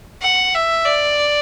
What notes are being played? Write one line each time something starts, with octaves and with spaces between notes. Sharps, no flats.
F#5
E5
D5